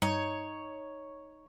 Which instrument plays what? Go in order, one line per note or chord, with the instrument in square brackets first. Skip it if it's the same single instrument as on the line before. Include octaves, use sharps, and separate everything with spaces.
[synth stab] G2 [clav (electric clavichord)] D#4 [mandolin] C#5